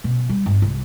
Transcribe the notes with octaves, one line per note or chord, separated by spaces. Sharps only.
B2
G3
G1
C2